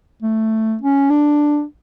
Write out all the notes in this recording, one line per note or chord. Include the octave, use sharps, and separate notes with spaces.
A3
C#4
D4